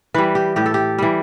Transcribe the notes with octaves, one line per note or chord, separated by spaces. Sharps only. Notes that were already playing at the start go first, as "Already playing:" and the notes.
E3 G3 B4
G4
A2 G4
A4
G4
E3 G3